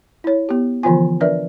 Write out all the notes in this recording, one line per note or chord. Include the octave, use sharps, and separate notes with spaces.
E4 C#5
B3 G4
D3 E3 F3 B3 F4 G#5
D4 A#4 B4 D5 E5